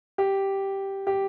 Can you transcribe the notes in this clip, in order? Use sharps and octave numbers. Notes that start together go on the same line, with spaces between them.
G4
G4